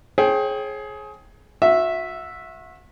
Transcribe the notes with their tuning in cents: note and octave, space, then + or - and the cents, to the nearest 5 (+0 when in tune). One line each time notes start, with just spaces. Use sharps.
G#4 +20 C#5 -45 G5 +0
F#4 -35 E5 +0